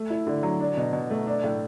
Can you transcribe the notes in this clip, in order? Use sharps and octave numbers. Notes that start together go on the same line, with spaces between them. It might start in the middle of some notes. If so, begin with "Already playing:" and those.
Already playing: A3
E4
D3
F#3
D4
B2
B2
A3
D4
A2